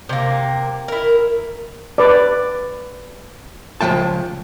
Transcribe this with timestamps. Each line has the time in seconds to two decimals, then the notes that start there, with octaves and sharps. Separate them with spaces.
0.09 C3 A#3
0.88 E4 A#4
1.98 B4 D5
3.81 C#2 G#2 F3 G5 A5